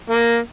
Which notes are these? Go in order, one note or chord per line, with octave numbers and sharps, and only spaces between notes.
A#3